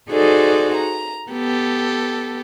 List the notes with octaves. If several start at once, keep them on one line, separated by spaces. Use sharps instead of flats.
D#4 F#4 G#4 A4 C5 D5
A#5
B3 G4 A4